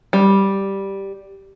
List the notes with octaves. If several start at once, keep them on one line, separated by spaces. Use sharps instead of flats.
G3